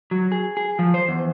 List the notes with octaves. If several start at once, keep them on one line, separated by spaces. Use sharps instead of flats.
F#3
G#4
G#4
F3
C5
E2